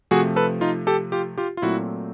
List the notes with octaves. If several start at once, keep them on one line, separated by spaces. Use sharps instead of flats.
C3 F3 A3 F#4 G#4
A4 B4
D#4 F4
G4 A4
F4 G4
F4 G4
F4
A#2 F#3 A3 C4 E4 F#4